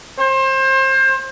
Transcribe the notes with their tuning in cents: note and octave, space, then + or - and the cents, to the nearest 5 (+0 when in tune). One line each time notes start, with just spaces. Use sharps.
C5 +30